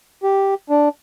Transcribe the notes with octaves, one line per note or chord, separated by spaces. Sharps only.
G4
D4